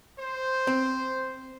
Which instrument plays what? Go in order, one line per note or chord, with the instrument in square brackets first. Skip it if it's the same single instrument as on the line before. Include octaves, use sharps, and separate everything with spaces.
[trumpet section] C5
[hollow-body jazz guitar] C4